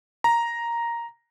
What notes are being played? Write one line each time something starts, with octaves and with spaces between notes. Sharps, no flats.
A#5